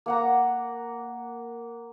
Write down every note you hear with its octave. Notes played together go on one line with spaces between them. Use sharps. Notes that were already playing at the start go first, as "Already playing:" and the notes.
A#3 F#5 A#5